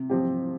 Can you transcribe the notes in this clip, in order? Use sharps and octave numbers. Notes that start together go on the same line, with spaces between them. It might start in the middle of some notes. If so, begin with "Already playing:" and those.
Already playing: C3
F3 C4 G4